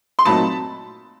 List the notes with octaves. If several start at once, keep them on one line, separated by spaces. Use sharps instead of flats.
C6
A#2 F#3 A3 C4 D#4 A5 B5